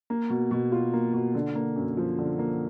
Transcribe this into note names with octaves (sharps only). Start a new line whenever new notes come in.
A#3
B2
B2
F4
A#3
B2
D3
A#3
F#2
F3
D3
A#3